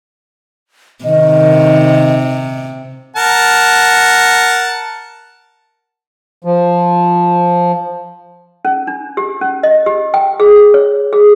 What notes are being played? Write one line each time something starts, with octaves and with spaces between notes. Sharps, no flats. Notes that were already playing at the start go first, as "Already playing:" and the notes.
C3 D#3 D#5
A#4 F#5 A5
F3
C#4
D4
G4
C#4
D#5
G4
G5
G#4
C#5
G#4